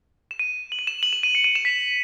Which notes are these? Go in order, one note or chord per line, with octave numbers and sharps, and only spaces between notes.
E7
D#7
F#7
D#7
E7
F#7
E7
D#7
C#7
D#7
E7
B6